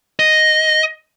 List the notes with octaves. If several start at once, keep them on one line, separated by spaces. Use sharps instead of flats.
D#5